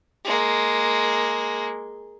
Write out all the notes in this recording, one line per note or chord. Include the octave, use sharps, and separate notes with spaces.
G#3 A#3